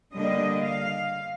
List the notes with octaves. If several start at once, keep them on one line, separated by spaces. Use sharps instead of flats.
D3 G3 A#3 D4 D#5
F5